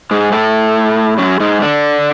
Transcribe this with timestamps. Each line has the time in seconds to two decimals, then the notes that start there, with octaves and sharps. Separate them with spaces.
0.11 G#2 G#3
0.32 A2 A3
1.18 F#2 F#3
1.40 G#2 G#3
1.62 D3 D4